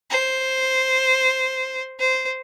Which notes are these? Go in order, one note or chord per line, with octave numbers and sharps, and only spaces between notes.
C5
C5